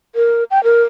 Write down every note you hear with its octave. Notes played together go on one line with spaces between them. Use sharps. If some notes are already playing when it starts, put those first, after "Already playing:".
A#4
G5
A#4